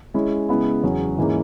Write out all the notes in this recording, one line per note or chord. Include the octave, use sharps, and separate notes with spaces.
G#3 C#4 E4
C#3 G#3 B3 E4
E2 C#3 F#3 C#4 G#4
G#2 E3 A#3 C#4 G#4